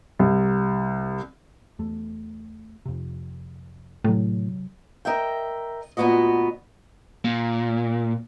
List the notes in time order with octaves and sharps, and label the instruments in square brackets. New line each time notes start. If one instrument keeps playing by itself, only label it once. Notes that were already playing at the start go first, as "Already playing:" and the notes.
[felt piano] C2
[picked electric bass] E2 A3
F2 C3
[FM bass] A2 [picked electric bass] C3 F#3
[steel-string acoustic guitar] A#4 D#5 E5 G5
D2 A#2 C#3 B3 F#4 D#5
[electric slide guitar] A#2